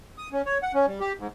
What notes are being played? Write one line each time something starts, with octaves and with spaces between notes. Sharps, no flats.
D#6
C#4
C#5
F#5
C#4
G3
G4
G#2